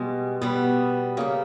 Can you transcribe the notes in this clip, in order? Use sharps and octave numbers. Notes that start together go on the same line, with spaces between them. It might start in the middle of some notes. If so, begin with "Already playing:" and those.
Already playing: B2 G3 G#3
B2 G3 B3
C#3 G3 A#3